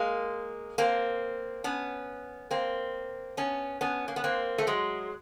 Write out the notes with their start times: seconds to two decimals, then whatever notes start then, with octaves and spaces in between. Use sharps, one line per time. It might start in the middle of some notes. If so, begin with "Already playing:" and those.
Already playing: G#3 A#3
0.78 A#3 C4
1.64 B3 C#4
2.51 A#3 C4
3.37 B3 C#4
3.81 B3 C#4
4.08 A#3
4.16 B3
4.24 A#3 C4
4.58 A3
4.67 F#3 G#3